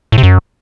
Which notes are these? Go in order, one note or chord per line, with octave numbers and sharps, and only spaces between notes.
A2
C3
F#2